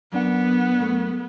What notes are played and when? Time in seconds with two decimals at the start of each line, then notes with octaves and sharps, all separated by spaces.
0.12 F#2 B3 D4 F#5
0.79 F#2 A3